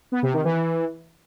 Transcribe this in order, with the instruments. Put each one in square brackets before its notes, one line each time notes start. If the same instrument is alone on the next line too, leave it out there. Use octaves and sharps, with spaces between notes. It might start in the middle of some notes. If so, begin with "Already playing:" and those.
[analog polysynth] B3
C3
D#3
E3